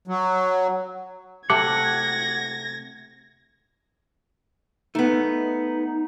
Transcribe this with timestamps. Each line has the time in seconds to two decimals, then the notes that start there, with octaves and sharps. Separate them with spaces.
0.08 F#3
1.50 C3 A3 F#5 D6 G#6 A#6
4.95 A3 B3 D#4